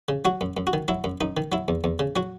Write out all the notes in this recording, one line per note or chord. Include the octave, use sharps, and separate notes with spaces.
C#3
F#3 F#4
F#2
F#2
F#4
D#3
F#3 E4
F#2
F#2 D#4
D#3
F#3 E4
E2
E2
C#3
F#3 F#4